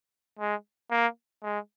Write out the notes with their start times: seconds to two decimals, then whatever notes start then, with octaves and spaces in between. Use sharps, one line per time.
0.39 G#3
0.91 A#3
1.43 G#3